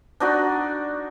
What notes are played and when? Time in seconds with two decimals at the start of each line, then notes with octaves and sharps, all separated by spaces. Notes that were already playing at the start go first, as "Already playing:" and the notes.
0.20 D4 D#4 F#4 D5